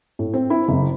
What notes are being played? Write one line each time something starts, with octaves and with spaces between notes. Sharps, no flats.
A2
C4
E4
F#1